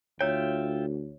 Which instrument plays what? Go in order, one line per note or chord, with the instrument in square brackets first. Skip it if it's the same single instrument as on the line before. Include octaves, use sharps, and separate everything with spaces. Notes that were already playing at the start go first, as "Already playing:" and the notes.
[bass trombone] D2 [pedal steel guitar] F4 E5 G5 [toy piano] C#5